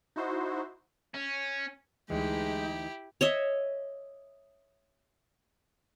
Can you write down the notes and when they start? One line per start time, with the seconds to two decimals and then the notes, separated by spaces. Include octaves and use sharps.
0.16 D#4 E4 F#4 C5
1.14 C#4
2.10 D2 E3 G#3 D#4 E4 G4
3.21 C#5 D#5 E5